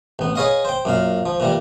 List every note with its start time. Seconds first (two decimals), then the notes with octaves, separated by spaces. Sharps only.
0.19 A1 B3
0.35 G#4 B4 C#5 D#5 F5 F#5
0.65 C5 G5
0.85 F#2 A#2 F5
1.26 F3
1.40 A#2 E3 G3